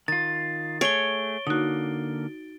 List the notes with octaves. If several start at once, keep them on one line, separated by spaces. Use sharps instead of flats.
D#3 F4 A6
A3 G#4 C#5 D7 G7
D3 A#3 D#4 F#4